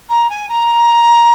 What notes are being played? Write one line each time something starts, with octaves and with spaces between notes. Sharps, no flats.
A#5
G#5
A#5